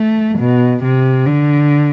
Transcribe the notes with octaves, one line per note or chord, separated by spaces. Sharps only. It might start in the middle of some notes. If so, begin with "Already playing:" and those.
Already playing: A3
B2
C3
D3